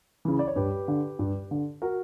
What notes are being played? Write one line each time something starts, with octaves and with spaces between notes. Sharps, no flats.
C#3 E3
D5
C#5
G2 G4 B4
D3
G2
D3
F#4 A#4